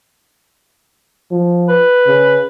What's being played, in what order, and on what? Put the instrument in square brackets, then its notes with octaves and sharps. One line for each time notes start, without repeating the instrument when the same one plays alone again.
[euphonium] F3
[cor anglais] B4
[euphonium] C#3